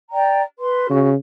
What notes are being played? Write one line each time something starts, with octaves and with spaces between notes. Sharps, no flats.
D5 G5 A#5
B4 C6
C#3 F#4